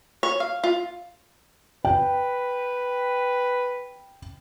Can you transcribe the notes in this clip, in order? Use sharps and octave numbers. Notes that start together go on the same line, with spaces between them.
C#5
F5
F4
B4 G5